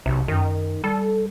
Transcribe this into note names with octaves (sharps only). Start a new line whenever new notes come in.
B1 C3
F#2 D#3
G3 A4